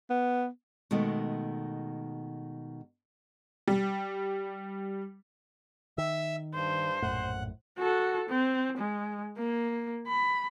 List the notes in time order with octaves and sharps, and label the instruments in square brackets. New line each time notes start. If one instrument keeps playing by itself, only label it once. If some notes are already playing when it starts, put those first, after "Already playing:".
[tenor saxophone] B3
[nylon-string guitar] B2 D#3 G#3 A3 B3
[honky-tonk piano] G3
[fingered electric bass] D#3 [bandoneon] E5 E6
[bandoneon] G2 [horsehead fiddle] C5
[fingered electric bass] A#1 F#2 A2 [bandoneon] F#5
[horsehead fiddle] F#4 A4
C4
G#3
A#3
B5